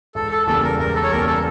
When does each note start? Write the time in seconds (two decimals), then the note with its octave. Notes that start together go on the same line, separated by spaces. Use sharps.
0.15 E1 A4
0.31 A4
0.47 E2 C#3 G3 A#3 A4
0.63 A#4
0.79 E1 A#4
0.95 A4
1.04 C#5
1.11 E2 C#3 G3 A#3 A#4
1.27 A4